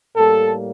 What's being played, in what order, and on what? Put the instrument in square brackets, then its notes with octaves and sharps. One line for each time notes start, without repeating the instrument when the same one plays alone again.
[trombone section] A2 G3 A#3 A4